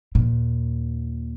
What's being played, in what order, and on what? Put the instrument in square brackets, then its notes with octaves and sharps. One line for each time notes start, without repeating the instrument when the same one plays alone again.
[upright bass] D#2 A#2